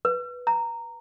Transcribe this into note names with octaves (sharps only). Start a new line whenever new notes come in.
B4
A#5